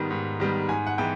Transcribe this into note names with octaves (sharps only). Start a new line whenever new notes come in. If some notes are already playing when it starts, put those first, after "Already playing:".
Already playing: G#2 D#3 G3 B3
G#2
D#3 G3 B3
G#2 G#5
F#5
E3 G#3 B3 G5